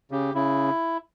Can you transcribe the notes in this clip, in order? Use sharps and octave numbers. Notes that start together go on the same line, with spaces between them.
C#3 G4
C#3 E4